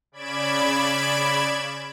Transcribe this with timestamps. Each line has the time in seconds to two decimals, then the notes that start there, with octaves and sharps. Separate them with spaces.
0.12 C#3 D5 B5 G#6 D7 E7